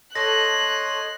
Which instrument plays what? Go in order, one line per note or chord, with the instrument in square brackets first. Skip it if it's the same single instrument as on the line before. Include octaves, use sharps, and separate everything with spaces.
[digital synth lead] A4 [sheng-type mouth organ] C#5 D#5 C6 [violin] F#6 [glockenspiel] A#6